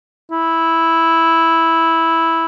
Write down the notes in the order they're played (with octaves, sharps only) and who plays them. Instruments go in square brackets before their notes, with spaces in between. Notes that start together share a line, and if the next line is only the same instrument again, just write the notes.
[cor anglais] E4